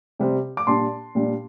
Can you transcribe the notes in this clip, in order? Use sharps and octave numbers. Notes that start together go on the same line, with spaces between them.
C3 G3 C4
D6
A#2 G3 D4 A5 C6
A#2 G3 D4